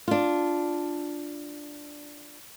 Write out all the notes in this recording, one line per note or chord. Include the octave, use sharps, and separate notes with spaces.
D4 F4